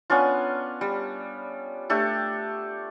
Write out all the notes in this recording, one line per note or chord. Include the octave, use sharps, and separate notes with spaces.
B3 C#4 D4 F4
G3
A3 D4 G4 A4